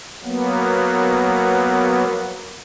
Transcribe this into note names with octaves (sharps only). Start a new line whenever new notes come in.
F#3 A#3 B3